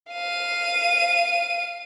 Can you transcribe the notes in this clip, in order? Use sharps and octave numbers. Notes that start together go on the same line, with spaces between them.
F5 D#7